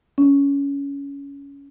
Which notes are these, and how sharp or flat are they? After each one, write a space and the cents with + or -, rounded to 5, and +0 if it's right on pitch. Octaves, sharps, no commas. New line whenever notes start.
C#4 +20